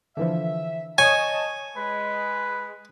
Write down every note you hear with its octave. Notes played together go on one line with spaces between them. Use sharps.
D3 E3 F3 E5
C#5 D#5 G#5 A5 D#6
G#3 B4